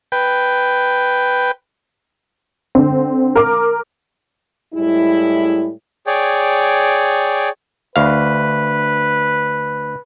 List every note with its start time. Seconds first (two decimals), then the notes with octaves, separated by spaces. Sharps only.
0.12 B4 G5
2.75 D3 C4
3.36 A#4 D6
4.74 A2 G3 G#3 E4
6.07 G#4 C#5 D5 G5
7.96 D2 B4 F5